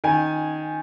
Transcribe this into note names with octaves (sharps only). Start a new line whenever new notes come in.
D#3 G#5